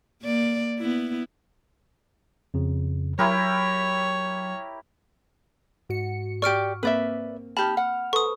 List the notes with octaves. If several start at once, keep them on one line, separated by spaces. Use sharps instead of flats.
A#3 D5
B3 E4
F2 C#3
F#3 E4 G4 A#4 C#5
G#2 F#4 C#7
G4 D5 C#6 F6 D7
A#3 C4 B4 D5 E5
D#4 G4 A5 B5 F6
F#5
A4 B4 C5 C#6 D#6